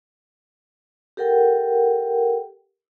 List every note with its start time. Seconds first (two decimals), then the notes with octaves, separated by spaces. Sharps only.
1.17 G4 A4 A#4 F#5 G5